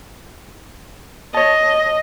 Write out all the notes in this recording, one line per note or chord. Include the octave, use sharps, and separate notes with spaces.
C#5 D#5 A5